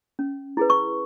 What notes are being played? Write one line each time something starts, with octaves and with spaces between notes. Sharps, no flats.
C#4
E4 G#4 B4
C#6